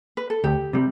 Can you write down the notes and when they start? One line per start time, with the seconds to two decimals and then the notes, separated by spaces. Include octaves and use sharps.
0.17 B4
0.30 A4
0.44 D2 G4
0.73 C3 G3